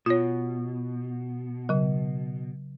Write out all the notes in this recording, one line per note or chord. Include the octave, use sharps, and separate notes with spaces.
B2 F4 C#5
C#3 F#3